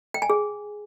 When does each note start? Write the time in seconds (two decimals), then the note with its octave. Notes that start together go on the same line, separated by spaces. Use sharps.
0.14 G5
0.22 G#5
0.30 G#4